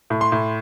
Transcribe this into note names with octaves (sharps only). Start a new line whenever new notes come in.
A2
C6
A2